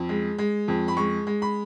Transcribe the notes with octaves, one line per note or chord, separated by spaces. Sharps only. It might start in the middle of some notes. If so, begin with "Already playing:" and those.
Already playing: F2
G#3
G#3
F2
B5
G#3 C#6
G#3
B5